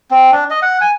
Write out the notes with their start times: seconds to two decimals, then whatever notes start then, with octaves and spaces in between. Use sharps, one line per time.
0.11 C4
0.32 D4
0.50 D#5
0.62 F#5
0.81 G#5